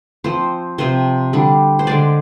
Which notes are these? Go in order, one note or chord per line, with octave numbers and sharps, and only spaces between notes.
F3 C4 C5
C3 F3 C4 C5
D3 G3 D4
C5
D3 G#3 D4 D5